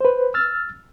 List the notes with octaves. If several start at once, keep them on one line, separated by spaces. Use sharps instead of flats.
B4 C5
E6 F6 A6